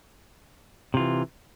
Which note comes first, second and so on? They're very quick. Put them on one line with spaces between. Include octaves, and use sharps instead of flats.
C3 F4 E3